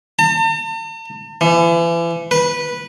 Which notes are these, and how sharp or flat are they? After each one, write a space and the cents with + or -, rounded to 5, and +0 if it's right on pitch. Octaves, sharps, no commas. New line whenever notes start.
A5 +45
E3 +35
B4 -10